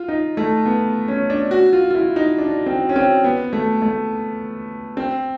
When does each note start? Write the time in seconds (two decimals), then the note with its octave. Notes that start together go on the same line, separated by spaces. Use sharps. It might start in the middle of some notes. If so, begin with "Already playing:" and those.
Already playing: F4
0.08 D#4
0.37 A3
0.66 B3
1.08 C#4
1.30 D4
1.51 F#4
1.73 F4
1.90 F4
1.95 E4
2.16 D#4
2.38 D4
2.66 C4
2.89 C#4
2.96 C4
3.24 B3
3.53 A3
3.82 A3
4.97 C4